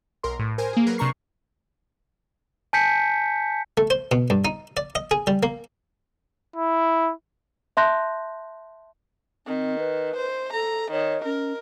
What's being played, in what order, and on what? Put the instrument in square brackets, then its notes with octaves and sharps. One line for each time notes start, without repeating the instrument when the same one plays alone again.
[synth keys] B1 A#4 C6
A2
A#4 C5 G#5
A#3 G#4
F#3 A#4 B4
C3 D4 A#5 C#6 C7
[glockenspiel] G#5 A5 G6 B6 C#7
[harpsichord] A3
C5
B2
G2
D#4
D5
D#5
G#4
G3
A#3
[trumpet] E4
[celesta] E5 A5 C6 F#6 G6 A#6
[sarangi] D#3 [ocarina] C4
[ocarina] B4
[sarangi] C5
[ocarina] A4 [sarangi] A#5
[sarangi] D#3 [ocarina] C#5
[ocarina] C#4 [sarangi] A#4